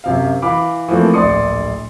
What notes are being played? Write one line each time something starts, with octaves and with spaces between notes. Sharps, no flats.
F#2 C3 F5
E3 F5 B5 D6
E3 F3 A3 A#3 C4
D1 A#1 D5 C6 D#6 C#7